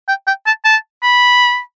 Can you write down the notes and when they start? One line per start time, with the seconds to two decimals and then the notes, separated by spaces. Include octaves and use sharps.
0.08 G5
0.27 G5
0.46 A5
0.65 A5
1.03 B5